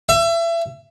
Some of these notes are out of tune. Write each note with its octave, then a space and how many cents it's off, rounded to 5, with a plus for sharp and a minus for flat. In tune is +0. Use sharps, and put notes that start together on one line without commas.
E5 +30